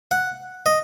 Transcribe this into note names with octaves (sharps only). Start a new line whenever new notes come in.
F#5
D#5